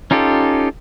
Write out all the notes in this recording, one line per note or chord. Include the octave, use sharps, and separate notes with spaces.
C#4 D#4 F4 G4 A4